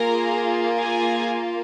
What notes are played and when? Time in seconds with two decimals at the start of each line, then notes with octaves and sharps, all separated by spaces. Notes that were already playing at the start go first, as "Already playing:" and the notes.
Already playing: A#3 F4 G#4 A#4 A#5
0.78 G#4 G#5